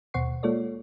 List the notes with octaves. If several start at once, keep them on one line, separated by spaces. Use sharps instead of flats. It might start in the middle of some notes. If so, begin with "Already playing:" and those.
D#2 B2 C5 F#5 C#6 C7
G#3 A#3 F4 A4 C#5 D5